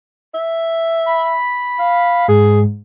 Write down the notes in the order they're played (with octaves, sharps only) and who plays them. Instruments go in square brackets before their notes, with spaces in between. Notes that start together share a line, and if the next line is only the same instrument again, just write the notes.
[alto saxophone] E5
[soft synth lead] B5
[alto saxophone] F5
[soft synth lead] G#2 [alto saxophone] G#4